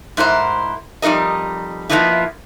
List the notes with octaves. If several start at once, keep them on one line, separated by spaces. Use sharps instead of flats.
G#2 E4 A#4 C5
F2 G3 D#4 A#4 D#5
F3 F#3 A#3 B3 D#4 E4